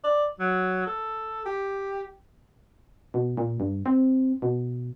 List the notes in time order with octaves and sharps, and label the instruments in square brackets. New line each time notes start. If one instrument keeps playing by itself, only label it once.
[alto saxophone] D5
F#3
A4
G4
[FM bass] B2
A#2
G2
C4
B2